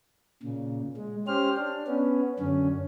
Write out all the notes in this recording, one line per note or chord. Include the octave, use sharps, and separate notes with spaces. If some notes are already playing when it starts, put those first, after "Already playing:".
A#2 C#3
G#3
C#4 G4 C5 F6
D4
B3 C#4
F#2 D3 C#4